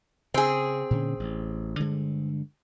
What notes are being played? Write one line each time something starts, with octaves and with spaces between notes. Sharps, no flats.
C#3 C4 G#4
A#2 D3 C#4
A1
G2 D3 G#3